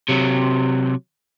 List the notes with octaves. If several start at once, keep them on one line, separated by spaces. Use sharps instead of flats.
C3 F#3